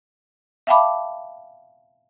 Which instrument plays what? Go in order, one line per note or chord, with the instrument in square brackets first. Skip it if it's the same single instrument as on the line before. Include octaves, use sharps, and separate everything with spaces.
[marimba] E5 F5 G5 A5 B5 D6